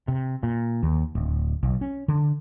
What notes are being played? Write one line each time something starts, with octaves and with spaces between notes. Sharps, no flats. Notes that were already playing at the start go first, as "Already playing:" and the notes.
C3
A#2
D#2
D1
B1
C#4
D3